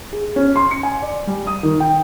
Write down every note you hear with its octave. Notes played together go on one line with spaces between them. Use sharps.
G#4
C#4
C6
C#7
G#5
D5
G3
D#6
D#3
G5